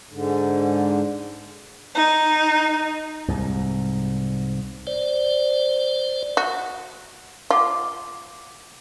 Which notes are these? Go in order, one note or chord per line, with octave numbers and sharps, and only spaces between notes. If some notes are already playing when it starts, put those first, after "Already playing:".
G#2 D3
D#4
C2 G#2
C5 D5
F#4
F4 F5 F#5 D6